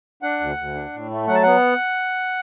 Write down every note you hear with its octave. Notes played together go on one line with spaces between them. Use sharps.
D4 F#5
D2
D2
D4
A2
A3
F#3 F#5
A5
B3 F#5